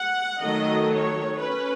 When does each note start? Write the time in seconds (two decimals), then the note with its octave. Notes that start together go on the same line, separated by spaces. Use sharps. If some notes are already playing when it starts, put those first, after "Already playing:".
Already playing: F#5
0.44 D#3 F#3 A3 D#5
0.94 C#5
1.43 C#4 B4